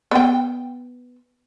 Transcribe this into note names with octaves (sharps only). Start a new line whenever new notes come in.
B3 G5